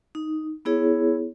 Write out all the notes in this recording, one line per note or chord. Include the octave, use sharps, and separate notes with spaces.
D#4
B3 E4 G#4 C#5